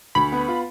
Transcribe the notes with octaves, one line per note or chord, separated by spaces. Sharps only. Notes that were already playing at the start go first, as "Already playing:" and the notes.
D2 B5
B3
F4